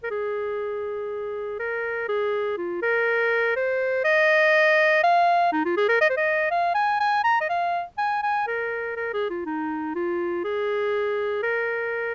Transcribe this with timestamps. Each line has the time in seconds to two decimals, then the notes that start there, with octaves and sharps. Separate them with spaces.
0.03 A#4
0.11 G#4
1.59 A#4
2.09 G#4
2.58 F4
2.82 A#4
3.56 C5
4.04 D#5
5.03 F5
5.52 D#4
5.65 F4
5.77 G#4
5.89 A#4
6.01 D#5
6.10 C5
6.17 D#5
6.51 F5
6.75 G#5
7.00 G#5
7.24 A#5
7.41 D#5
7.49 F5
7.98 G#5
8.23 G#5
8.47 A#4
8.96 A#4
9.14 G#4
9.30 F4
9.45 D#4
9.95 F4
10.44 G#4
11.43 A#4